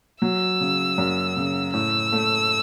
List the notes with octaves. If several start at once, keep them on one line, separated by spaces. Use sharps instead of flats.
F#3 E6
C#3
F#2
C#3
A2 E6
A3